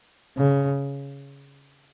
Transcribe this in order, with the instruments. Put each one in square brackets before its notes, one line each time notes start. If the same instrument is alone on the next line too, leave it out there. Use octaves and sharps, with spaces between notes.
[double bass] C#3